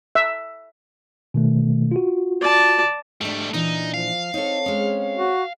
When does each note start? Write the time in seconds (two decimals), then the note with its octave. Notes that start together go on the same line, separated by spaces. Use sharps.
0.15 E5
1.34 B2 D#3 A3
1.91 F4 F#4
2.41 D5 A5
3.21 G#2 G3 A3 D4
3.54 A#2 E3 D4 D#4
3.94 F3 F5
4.34 C4 D#4 A4 C#5
4.66 G#3 C#4
5.17 F#4